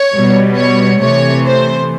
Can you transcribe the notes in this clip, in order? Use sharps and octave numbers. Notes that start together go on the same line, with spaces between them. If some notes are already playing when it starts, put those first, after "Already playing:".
Already playing: C#5
B2 G3
C#5
C3 E3 A3 C#5
C5